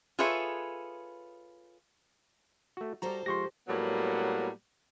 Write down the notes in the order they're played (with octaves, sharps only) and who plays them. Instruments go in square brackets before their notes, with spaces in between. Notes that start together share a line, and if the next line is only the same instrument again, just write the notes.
[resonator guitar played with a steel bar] F4 G#4 A4 B4 C#5 E5
[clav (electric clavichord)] A3 F#4
[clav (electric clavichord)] G3 F#4 [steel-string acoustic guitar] G#4 A4 C5 [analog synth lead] A#5
[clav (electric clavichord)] F3 G#3 [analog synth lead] G4 [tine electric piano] C6 C#6 A#6
[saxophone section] A2 F#3 G3 A#3 B3